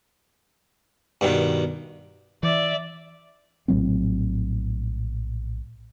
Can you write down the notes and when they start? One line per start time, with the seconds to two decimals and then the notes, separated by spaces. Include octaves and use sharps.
1.21 G2 B2 D#3
2.43 E3 D5 E5
3.68 A#1 A2 F#3 C4